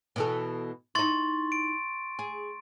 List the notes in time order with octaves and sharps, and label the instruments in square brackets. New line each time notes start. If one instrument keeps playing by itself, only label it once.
[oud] B2 E3 A4
[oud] D#4 E4 [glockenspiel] C6 C#6 A6
[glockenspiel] D7
[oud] G#4